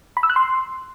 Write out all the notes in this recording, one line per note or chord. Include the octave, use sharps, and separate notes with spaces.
B5
E6
F#6
C6